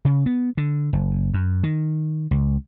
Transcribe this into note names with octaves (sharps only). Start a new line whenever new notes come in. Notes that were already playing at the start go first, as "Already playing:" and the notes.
C#3
B3
D3
F#1
F#2
D#3
C#2